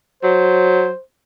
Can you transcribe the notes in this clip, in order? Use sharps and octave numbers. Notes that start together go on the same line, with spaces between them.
F#3 C5